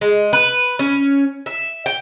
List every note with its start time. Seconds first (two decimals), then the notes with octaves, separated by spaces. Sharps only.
0.01 G#3
0.33 B4
0.79 C#4
1.46 E5
1.86 G5